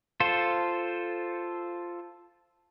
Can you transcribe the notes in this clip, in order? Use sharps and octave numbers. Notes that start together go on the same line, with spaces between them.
F4 A4 C5